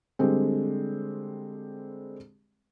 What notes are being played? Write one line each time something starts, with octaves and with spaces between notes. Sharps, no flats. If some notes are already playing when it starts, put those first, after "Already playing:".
D3 G3 G#3 C4